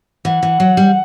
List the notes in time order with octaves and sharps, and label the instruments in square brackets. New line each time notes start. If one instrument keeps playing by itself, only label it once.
[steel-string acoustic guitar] E3 [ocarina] F#5
[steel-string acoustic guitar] E3
F#3
G3